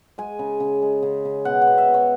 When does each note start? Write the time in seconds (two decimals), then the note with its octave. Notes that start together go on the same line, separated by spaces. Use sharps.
0.18 G#3 G#5
0.39 C#3
0.60 C#3
0.82 G#3
1.03 C#3
1.25 C#3
1.45 B2 F#5
1.62 F#5
1.67 B2
1.78 E5
1.88 B2
1.94 C#5